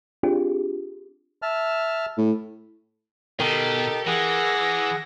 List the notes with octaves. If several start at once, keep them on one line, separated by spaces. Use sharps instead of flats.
C4 D4 F4 G4 G#4
E5 A5 F6
A2
B2 D#4 G4 A4 A#4 G5
E3 G#4 F#5 A#6